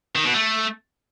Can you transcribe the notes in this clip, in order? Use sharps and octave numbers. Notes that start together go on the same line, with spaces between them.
D#3
B2
A3